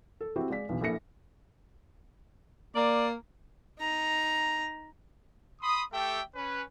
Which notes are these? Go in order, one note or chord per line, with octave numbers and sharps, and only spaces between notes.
A4
C4 E4 F#4 G4
G#3 D5 F5 B6
B1 E2 B2
A#1 A#2 E4 A4 A#6 C#7
A#3 D5
D#4 A#5
B5 C6 D#6
A3 G4 A4 E5 G5
C#4 B4